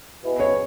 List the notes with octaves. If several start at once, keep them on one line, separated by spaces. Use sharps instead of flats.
B2 B3 E4 G#4 B4
C#5